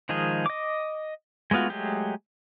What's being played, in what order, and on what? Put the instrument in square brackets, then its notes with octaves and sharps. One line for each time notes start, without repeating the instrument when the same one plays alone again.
[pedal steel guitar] D#3 F3 G#3 G#4
D#5 D6
G#3 A3 B3 F4 F#4
F#3 G#3 A3 G4 G#4